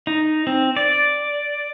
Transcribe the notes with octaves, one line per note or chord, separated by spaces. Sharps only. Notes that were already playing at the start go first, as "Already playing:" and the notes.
D#4
C4
D5